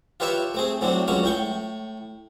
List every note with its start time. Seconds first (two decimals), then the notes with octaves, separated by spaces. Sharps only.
0.20 F4 G4 B4 C#5 E5 A5
0.54 A3 C4 G#4
0.81 A2 F#3 C4 D4
1.08 C#2 F#3 C#4 C#5
1.23 A2 G5 C#6